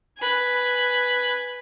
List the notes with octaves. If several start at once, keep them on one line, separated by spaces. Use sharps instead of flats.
B4 G#5